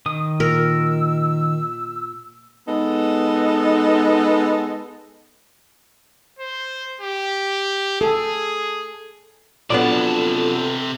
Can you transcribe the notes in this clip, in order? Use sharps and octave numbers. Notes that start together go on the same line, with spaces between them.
D#3 D#6
A#2 A#4 E6
G#3 B3 D#4 A4
C5
G4
G#4 A4
C3 F3 F#3 B3 D4 A4 D5 A5